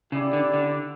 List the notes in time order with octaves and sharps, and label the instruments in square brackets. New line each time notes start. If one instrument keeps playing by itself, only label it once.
[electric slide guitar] C#3 [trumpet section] E4 G4 D5
[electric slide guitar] D3
D3